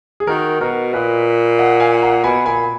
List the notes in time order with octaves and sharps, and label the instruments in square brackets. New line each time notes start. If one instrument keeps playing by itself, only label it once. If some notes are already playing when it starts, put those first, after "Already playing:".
[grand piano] G#4
[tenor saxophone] D#3 [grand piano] F#4 A#4
[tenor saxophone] B2 [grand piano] F#4 A#4
[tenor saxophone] A#2 [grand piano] B4 D#5
[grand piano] D#5 F#5
F5 G#5
F#5 A#5
[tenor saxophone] B2 [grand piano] G#5 B5
[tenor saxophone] A#2 [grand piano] G#5 B5